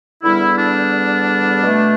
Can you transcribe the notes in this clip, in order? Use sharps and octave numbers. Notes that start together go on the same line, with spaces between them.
E2 D3 G3 B3 E4
D4
B2 A3